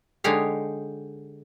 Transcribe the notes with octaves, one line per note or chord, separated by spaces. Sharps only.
D3 G#3 D#4 G4 C#5 F5